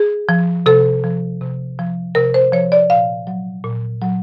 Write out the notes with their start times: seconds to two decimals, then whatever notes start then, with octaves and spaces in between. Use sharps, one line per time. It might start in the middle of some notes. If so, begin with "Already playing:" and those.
Already playing: G#4
0.29 F3
0.66 C3 A4
1.04 F3
1.41 C3
1.79 F3
2.15 C3 A#4
2.34 C5
2.53 F3 C#5
2.72 D5
2.90 A#2 F5
3.27 F#3
3.64 A#2
4.02 F#3